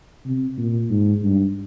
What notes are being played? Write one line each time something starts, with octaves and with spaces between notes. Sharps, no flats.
C3
A#2
G#2
G2